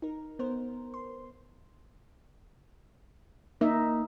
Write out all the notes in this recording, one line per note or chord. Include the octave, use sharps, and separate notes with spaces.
D#4 A#4
B3 A#4 C5
C6
A#3 D#4 E5